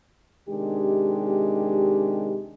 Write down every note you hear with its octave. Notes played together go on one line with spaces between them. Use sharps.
C3 D#3 G#3 D4 G4